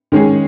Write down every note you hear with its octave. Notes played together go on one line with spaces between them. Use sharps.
D#3 G#3 C#4 G#4